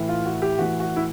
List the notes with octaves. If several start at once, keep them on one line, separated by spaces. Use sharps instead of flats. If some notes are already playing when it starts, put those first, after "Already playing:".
Already playing: A2 E3
F4
F#4
G4
A2 E3 F#4
F#4
E4